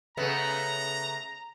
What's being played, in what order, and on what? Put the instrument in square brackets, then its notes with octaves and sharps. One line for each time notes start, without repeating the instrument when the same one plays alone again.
[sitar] C#3 A3 B3 [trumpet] A#5